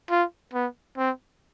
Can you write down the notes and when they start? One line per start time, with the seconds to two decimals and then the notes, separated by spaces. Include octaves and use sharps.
0.10 F4
0.53 B3
0.97 C4